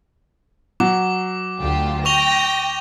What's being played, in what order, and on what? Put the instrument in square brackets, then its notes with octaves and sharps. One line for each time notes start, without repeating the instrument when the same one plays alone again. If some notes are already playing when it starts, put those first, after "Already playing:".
[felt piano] F#3 [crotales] D6
[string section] D2 F4 G4
[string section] G5 A#6 [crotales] C#6 F7 G7